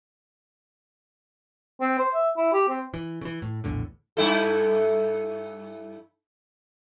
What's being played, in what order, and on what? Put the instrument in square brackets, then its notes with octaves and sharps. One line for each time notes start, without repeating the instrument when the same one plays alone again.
[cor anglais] C4
C5
E5
E4
G4
C4
[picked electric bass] E3
C#3 E3
A2
A#1 E2 A2 D3
[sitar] G2 E4 A4